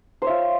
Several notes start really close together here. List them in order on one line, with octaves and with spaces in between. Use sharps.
C5 C#5 E5 F4